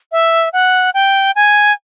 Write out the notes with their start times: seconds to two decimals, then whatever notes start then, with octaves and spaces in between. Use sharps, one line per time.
0.12 E5
0.53 F#5
0.94 G5
1.36 G#5